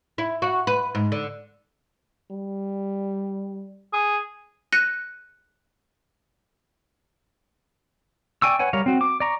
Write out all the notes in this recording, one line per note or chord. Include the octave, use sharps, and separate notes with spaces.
E4
F#4
B4
G#2
D3
G3
G#4
F#6 A#6 C#7 D#7
D5 G5 G#5 C#6 E6
B4 C#5 F#5 G#5
G3 A#4 C#5 F5
C4 F#4
D6
D5 A#5 C#6